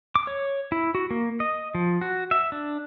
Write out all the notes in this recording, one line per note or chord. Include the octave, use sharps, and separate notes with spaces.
D6
C#5
E4
F#4
A#3
D#5
F3
F#4
E5
D4